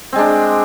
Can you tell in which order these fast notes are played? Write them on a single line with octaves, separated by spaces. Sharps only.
C4 G#3 D4